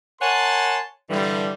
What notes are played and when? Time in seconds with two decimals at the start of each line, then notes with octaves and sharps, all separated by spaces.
0.21 A#4 C#5 F#5 G#5 A5 C6
1.10 G2 D3 E3 G3